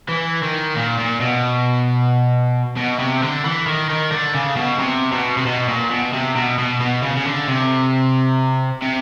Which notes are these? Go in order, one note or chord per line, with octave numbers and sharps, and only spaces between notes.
E3
D#3
A#2
A#2
B2
B2
C3
D3
E3
D#3
D#3
D3
C#3
B2
C3
B2
C3
B2
A#2
B2
C3
B2
B2
B2
C#3
C#3
D3
C3
C3